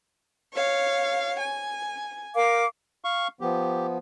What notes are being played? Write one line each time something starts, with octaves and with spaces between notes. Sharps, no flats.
C#5 F5
G#5
A#4 F5 D6
F5 C#6
F3 B3 G4